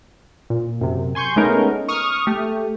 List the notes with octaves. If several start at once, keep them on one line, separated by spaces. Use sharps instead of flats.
A#2
F#2 C3
G#5 C6 C#6 G6
G#3 A3 B3 C#4 D#4 A#4
C#6 D#6 F6
A3 G4